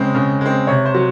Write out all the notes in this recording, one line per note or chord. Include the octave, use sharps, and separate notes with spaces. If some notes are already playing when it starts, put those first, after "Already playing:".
Already playing: C#3 G#3 C4 D#5
C#3
G#3 C4
C3 C#5
C5
F#3